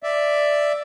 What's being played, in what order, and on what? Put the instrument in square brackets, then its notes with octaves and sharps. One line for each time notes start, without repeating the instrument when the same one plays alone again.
[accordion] D5 E5